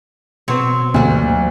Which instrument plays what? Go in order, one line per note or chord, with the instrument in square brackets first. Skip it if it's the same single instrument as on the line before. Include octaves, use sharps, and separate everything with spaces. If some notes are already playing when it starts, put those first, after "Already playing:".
[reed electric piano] B2 B3 [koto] F#3 C4 C#5
[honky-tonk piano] D2 [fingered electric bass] E3 F#3 A#3 [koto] G3 D4